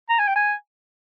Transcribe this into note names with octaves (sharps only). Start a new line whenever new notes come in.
A#5
G#5
G5
G#5